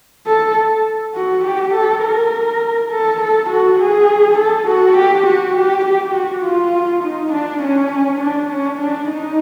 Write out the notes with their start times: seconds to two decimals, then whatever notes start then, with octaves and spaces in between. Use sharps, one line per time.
0.27 A4
1.15 F#4
1.44 G4
1.74 A4
2.03 A#4
2.91 A4
3.21 A4
3.50 F#4
3.80 G#4
4.38 A4
4.68 F#4
4.97 G4
5.27 F#4
5.56 G4
5.85 G4
6.15 F#4
6.44 F4
7.03 D#4
7.33 D4
7.63 C#4
8.21 D4
8.50 C#4
8.80 D4
9.09 D#4